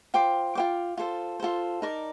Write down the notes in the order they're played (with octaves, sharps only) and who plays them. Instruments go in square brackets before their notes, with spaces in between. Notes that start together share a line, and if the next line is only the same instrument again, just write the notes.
[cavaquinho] F4 C5 G5 D6
F4 C5 G5 D6
F4 A4 C5
F4 A4 C5
D#4 A#4 D5 A5